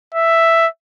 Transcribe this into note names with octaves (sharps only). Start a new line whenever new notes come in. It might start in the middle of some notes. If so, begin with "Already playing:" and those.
E5